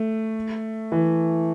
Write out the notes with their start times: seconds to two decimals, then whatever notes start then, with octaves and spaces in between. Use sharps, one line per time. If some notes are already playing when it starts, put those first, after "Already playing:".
Already playing: A3
0.92 E3